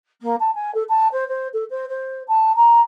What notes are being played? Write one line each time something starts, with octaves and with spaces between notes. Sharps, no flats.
A#3
A5
G#5
A4
A5
C5
C5
A4
C5
C5
A5
A#5